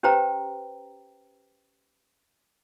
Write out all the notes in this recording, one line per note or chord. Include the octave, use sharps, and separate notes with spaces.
C#4 G4 B4 C5 G5 A#5